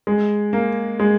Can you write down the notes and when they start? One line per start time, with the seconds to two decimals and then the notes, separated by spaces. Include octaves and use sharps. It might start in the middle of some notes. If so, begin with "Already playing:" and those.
0.07 G#3
0.53 A#3
1.00 G#3